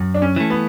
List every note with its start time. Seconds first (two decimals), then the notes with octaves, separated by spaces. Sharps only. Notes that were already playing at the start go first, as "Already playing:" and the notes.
Already playing: F#2
0.14 D4
0.22 C#4
0.36 E3 A3
0.50 B3